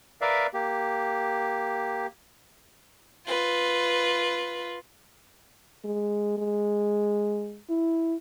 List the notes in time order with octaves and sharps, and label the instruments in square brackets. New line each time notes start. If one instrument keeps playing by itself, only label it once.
[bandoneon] A#4 B4 D5 E5 F5
A#3 G4
[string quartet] F4 B4
[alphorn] G#3
G#3
E4